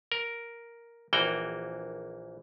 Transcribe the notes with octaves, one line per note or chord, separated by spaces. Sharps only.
A#4
A#1 E3 A#3 F#4 G5